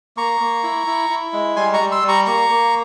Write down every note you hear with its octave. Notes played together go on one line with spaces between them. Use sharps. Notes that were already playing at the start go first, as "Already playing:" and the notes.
A#3 A#5 C#6
A#3
E4
E4
E4
G#3
G3 G#5 C6
A#5 C#6
G3
C6 E6
G3
A#5 C#6
A#3 A#5 C#6
A#3